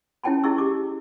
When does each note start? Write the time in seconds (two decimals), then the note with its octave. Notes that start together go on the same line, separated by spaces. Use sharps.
0.24 C#4 E4 C#5 G5 A5 B5
0.44 E4 G#4 D#5 C#6 E6
0.58 G4 D6